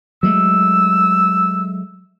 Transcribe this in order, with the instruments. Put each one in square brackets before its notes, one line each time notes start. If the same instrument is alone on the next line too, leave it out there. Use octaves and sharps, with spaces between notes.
[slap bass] F#3 G#3 A3 [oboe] E6